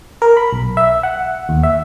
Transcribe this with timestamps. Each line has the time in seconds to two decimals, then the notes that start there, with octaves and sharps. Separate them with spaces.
0.22 A#4
0.37 B5
0.53 B1
0.77 E5
1.03 F#5
1.49 D#2
1.63 E5